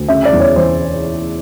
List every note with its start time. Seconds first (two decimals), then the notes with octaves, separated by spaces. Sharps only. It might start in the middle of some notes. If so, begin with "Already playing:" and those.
Already playing: D2
0.08 C#3 E5
0.25 D5
0.33 E2
0.40 C#5
0.56 E3 C5